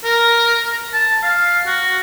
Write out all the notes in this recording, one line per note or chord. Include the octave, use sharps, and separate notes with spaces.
A#4
A5
F5
F#4